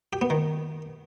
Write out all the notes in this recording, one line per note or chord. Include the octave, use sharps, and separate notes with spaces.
G4
B3
D#3